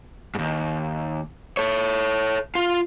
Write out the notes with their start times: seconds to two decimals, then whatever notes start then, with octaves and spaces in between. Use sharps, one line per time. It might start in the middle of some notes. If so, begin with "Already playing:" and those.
0.35 D#2 G#2
1.57 A4 C#5
2.55 F4